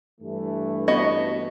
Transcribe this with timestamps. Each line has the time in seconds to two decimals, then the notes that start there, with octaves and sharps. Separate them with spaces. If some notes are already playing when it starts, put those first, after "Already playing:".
0.21 G2 E3 A3
0.88 B3 F#4 D#5